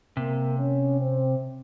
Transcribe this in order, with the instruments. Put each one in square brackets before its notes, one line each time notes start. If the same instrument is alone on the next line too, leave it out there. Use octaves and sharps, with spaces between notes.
[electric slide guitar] C3 [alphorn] A#3
[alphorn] C#4
C4